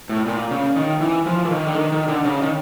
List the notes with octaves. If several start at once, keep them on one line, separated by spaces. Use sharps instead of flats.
A2
A#2
C#3
D#3
E3
F3
E3
D#3
D3
D#3
D#3
D3
C#3
D#3